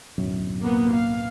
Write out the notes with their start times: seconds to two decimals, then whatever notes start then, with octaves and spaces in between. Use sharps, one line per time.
0.18 D1 B1 F#2
0.62 A#3 B3
0.93 F5